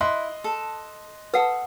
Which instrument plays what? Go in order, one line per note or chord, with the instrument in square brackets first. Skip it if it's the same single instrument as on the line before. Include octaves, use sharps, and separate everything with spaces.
[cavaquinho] E4 [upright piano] D#5 C6 F#6
[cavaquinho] A4
[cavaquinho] A4 D#6 [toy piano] B4 F#5